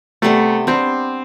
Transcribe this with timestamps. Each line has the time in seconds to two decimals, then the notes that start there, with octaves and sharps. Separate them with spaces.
0.22 C3 G3 A3 B3
0.67 G3 B3 C4 D4